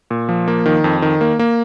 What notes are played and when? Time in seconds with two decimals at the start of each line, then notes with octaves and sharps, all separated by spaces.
0.11 A#2
0.29 F3
0.48 A#3
0.66 D#3
0.84 F2
1.02 D#3
1.21 A#3
1.39 A#3